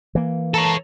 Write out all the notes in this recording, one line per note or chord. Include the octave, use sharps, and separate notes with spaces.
E3 A#3
A4 C#5 A5 A#5